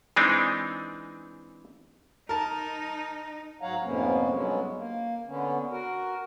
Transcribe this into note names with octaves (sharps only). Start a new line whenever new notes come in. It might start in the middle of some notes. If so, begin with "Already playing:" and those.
E3 G#3 C4 D4 D#4
D#4 A#4 A5
G#2 F#3 C#5 F5 F#5 A#5
F2 G#2 C3 A#3 B3 C#4
G2 F#3 G#3 B3 C#4
A#3
D3 B3 C#4
F#4 A#4